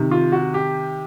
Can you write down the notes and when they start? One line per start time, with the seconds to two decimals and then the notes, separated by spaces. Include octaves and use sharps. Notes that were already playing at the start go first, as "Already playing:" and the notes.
Already playing: C3 D#3
0.11 F4
0.32 F#4
0.54 G4